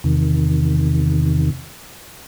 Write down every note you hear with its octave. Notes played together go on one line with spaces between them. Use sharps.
E2 C3 D#3